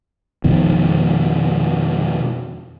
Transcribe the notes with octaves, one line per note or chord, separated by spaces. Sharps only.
F2 B2 D#3